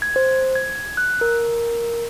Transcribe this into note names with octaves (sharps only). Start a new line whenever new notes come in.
G#6
C5
G#6
F#6
A#4